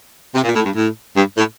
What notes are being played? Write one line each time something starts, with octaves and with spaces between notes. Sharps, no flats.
C3
A#2
A2
G2
A2
G2
A2